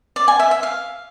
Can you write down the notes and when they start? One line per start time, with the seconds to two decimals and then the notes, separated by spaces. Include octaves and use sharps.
0.16 D5
0.28 G#5
0.40 E5
0.51 E5
0.63 F5